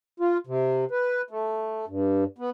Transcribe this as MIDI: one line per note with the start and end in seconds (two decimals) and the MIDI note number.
0.20 0.37 65
0.47 0.85 48
0.91 1.22 71
1.31 1.85 57
1.88 2.24 43
2.38 2.50 59